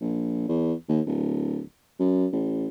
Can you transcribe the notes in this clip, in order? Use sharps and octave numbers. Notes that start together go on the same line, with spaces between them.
A#1
E2
D#2
D1
F#2
A1